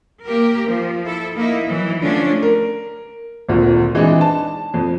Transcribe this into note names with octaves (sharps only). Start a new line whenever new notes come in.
A#3 G4 A#4
F3
E4 A4
A#3 D#4 E4
E3 F#3
D3 F3 A3 C#4 D4
A#4
G#1 D2 A#2
E3 G#3 C4 D4 D#4
A5
F2